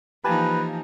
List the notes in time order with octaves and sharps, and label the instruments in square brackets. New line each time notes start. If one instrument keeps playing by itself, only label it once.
[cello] E3 A#3 [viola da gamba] F3 D#4 [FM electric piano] G4 G#5 A5 [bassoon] B4